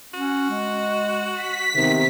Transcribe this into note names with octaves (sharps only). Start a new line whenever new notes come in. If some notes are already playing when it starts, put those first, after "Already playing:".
C#4 F#4
G#3
B6
C3 D#3 B3